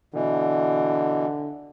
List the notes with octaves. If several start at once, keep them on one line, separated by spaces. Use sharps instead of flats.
B2 D3 E3